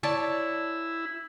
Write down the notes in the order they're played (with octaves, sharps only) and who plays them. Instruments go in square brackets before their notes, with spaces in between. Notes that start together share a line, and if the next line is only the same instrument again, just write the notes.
[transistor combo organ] E4 [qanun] C#5 D5 A5